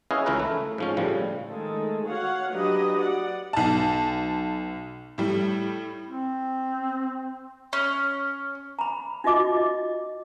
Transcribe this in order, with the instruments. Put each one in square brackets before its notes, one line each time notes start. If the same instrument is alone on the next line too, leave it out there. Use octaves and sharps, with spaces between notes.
[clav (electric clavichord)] C#4 E4 G#4 B4 D#5 F5
C#2 E3 C#4 E4 A#4 B4
A3
G#2 F3 C#4
A2 C#3 F3 G3
[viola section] D#3 G#3 A3 A4
F#4 C#5 F5 F#5
F#3 D4 G4 B4 D#5
D5 F#5
[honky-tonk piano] B1 A5
A2 G3
[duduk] C4
[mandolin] C#4
[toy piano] A#5 B5
D#4 F4 F#4 D#5 D6
D#5